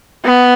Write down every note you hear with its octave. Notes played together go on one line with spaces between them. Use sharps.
B3